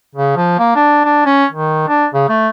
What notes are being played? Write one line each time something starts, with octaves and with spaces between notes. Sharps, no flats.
C#3
F3
A#3
D4
D4
C#4
D#3
D4
C#3
A3